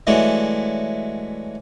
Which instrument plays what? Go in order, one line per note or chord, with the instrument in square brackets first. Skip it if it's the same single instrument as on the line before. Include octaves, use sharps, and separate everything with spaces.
[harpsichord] E3 F#3 G#3 A3 D4